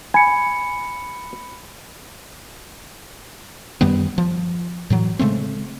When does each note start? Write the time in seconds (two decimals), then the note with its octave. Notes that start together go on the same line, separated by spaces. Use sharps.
0.14 G#5 B5 C#7
3.81 F#2 D#3 G3 B3
4.18 F3
4.90 A2 E3 F#3
5.19 C#3 G#3 A3 C4